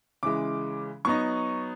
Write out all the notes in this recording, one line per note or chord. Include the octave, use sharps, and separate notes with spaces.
C#3 E3 G#3 D6
F#3 B3 D#4 C#6